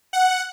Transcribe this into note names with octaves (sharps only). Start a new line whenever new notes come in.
F#5